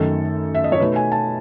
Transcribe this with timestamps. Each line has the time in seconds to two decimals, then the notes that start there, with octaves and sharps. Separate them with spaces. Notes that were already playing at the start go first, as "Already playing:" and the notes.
Already playing: F#2 D#3 A3 D#4 A4
0.55 E5
0.64 D#5
0.72 C#5
0.80 B2 A3 D#4 B4
0.96 G#5
1.12 A5